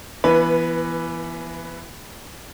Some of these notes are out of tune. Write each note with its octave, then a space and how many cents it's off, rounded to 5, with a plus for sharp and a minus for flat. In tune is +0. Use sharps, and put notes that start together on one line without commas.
E3 +25 B3 -15 B4 +0